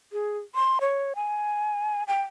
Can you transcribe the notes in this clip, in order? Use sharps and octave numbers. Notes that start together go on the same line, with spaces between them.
G#4
C6
C#5
G#5
G5